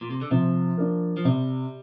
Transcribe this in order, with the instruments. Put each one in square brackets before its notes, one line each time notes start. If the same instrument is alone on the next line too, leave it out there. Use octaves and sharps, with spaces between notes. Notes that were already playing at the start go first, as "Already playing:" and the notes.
[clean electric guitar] A#2
C3
D3
[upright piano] C3 [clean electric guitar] F3
[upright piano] A#3 D4
[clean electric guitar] F3
[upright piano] C3 [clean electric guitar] G3